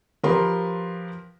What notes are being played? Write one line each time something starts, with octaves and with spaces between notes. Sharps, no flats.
F3 G4 A#4 B4 C6